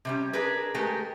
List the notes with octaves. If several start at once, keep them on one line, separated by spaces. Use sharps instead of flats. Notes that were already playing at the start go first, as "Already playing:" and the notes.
C3 G3 C#4
D4 G#4 A#4 B4
G#3 A3 G4 A#4